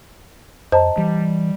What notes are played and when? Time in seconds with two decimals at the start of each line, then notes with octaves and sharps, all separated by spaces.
0.72 F2 C5 D#5 A5 A#5
0.98 E3 G3